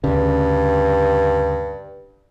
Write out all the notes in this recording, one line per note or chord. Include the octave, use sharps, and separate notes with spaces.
D2 G2 C#3